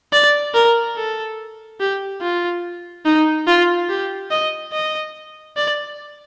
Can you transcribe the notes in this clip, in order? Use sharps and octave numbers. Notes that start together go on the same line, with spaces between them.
D5
A#4
A4
G4
F4
D#4
F4
G4
D#5
D#5
D5